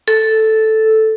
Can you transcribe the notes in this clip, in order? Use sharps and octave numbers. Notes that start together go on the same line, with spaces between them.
A4